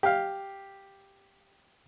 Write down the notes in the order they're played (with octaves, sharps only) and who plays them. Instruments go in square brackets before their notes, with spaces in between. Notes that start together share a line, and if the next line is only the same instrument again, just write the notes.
[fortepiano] G4 F5